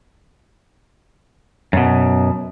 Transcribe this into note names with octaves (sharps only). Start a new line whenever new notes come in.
F#2 B2